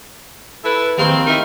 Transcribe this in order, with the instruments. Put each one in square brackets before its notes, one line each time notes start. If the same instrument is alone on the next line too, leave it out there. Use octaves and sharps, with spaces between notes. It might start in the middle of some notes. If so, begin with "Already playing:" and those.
[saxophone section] E4 A4 B4
[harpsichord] D#2 F5 C6 [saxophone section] C4
[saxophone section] D#4 E4 A#4